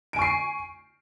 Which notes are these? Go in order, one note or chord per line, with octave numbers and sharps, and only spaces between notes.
G#5 C#6 C7 D7